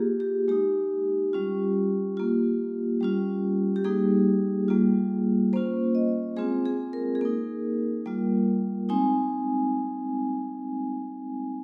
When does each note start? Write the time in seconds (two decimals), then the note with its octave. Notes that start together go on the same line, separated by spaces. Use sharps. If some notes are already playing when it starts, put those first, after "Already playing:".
Already playing: A#3 F4 G4 G#4
0.20 G4
0.48 G#3 D#4 G4
1.33 G3 C#4 F4
2.17 A#3 F4
3.01 G3 C#4 F4
3.76 G4
3.84 G3 A#3 D#4 G#4
4.68 G3 A#3 F4
5.53 A#3 C#4 F4 C5
5.95 D#5
6.36 G#3 C4 F4 G#4
6.66 G#4
6.93 A#4
7.15 G#4
7.21 A#3 D#4 A#4
8.06 G3 A#3 F4
8.89 G#3 C4 D#4 G#5